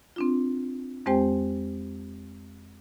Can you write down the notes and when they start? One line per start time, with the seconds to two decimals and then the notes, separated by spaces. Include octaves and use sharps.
0.16 C4 D4 F4
1.06 F2 G#3 C4 G4 C5 G5